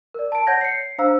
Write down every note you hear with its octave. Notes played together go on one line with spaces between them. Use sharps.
A#4 D5
A5 D7
C#5 F#5 G6 G#6 A#6
C7 C#7
D4 C5 F5 A#5 E6